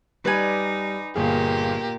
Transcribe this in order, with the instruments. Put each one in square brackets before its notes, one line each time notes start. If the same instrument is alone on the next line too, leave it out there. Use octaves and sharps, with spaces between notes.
[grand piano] G3 [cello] D#4 [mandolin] B4 D5 G#5
[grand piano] G1 G#4 [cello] A#2 [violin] A#3 G4